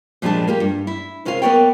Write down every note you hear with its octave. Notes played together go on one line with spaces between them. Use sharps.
A#2 F3 G3 G#3 D4 A5
A#3 F4 G4
G2
E4
C3 C#4 F4 A#4 F5
A#3 B3 A#4 C#5 D5 G5